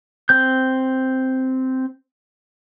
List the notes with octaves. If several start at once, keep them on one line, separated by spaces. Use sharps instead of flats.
C4 G6